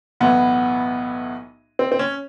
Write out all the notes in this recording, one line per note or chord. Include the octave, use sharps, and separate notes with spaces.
B1 A2 E3 B3
C4
C4
C#4